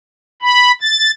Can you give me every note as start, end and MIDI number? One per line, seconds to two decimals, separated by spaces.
0.42 0.72 83
0.81 1.11 93